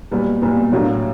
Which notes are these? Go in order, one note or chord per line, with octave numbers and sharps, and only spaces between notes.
B1 A#2 G3 B3
B1 A#2 G3 B3
A2 F#3 A#3 D4